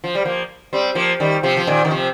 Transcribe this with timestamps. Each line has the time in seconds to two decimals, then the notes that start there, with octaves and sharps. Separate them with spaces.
0.04 F3
0.15 G3
0.25 F3 A#3
0.73 G3 C4
0.95 F3 A#3
1.20 D#3 G3
1.43 C3 F3
1.57 F3
1.67 A#2 D#3
1.85 D#3
1.90 C3 F3